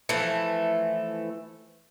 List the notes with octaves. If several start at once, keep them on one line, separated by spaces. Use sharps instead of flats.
E3 F3 A3